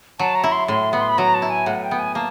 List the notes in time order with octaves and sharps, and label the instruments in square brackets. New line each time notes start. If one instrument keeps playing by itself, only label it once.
[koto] F#3 [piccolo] A5
[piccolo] A#5
[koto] E4
[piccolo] C6
[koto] A2 [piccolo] C6
[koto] B3 [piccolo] B5
[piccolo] C6
B5
[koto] F#3 [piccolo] A#5
[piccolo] A5
[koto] E4
[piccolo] G#5
[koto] A2 [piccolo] F#5
[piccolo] G5
[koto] B3
[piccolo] G#5
[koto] A#3 [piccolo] A5